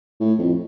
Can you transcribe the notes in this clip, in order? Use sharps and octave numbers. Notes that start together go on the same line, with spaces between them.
A2
F2